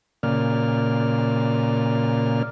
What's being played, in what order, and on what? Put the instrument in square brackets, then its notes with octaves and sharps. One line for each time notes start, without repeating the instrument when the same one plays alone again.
[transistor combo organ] A#2 C#3 A#3 D5 F6